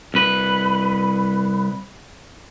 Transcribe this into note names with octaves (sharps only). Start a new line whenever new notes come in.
C2 B4